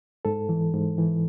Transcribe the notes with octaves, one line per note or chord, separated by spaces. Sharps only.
G#2 A4
E3
G#2
E3